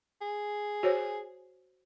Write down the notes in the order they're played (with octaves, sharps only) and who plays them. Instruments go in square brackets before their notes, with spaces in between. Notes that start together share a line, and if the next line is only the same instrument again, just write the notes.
[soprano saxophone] G#4
[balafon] F#4 C5 C#5